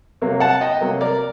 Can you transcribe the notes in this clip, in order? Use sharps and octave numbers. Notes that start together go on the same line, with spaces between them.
C3 F#3 A#3
F#5 A5
D#5 G5
C3 F#3 A#3
A#4 D5